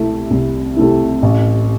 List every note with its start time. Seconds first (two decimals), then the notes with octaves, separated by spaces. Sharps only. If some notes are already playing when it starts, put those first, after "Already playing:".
Already playing: C2 C3 A3 E4
0.31 C2
0.77 C3 A3 E4
1.22 A1